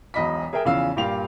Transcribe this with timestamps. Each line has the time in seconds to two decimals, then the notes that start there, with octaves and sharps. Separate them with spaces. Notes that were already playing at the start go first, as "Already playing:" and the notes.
0.14 E1 B1 D#5 B5 B6
0.53 G#4 A#4 E5 G5
0.65 E2 C#3 F3 F5 E6
0.96 G2 A#2 F4 G4 F5 F7